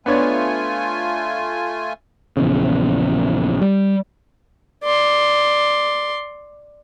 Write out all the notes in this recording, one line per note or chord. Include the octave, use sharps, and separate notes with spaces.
A3 B3 D4 F4 C#5 G#5
A#1 E2 C#3
G3
D5 C6